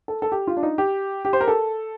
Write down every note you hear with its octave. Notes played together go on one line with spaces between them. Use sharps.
A4
A4
G4
F4
D4
D#4
G4
G4
C5
A#4
A4